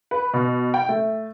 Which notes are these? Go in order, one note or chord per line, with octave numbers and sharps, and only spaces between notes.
B4
B2
G5
A3